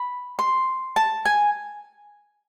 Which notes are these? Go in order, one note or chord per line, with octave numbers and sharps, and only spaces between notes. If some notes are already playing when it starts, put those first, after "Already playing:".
Already playing: B5
C6
A5
G#5